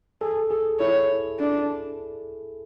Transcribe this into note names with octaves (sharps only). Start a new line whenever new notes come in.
G#4 A4
G#4 A4
E4 C#5
D4